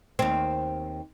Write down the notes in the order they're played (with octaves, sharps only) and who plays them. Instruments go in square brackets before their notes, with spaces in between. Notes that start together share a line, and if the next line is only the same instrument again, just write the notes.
[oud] D#2 C4